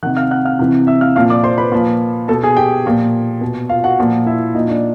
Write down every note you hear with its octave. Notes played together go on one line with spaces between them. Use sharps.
C3 D#3 F#5 F#6
F5 F6
F#5 F#6
F5 F6
C3 E3
E5 E6
F5 F6
A#2 F3 F5 F6
D5 D6
C5 C6
B4 B5
A#2 F3
B2 A4 A5
G#4 G#5
G4 G5
A#2 F3
B2
F4 F5
F#4 F#5
A#2 F3
E4 E5
A#2 F3 D#4 D#5
D4 D5